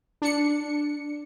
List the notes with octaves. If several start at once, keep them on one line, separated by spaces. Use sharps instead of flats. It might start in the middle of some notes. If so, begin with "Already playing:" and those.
D4 C#7